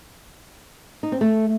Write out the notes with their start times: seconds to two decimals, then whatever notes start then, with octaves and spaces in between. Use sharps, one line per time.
1.03 D#4
1.12 C4
1.21 A3